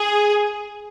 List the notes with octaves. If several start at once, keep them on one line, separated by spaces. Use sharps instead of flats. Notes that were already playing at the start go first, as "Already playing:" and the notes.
Already playing: G#4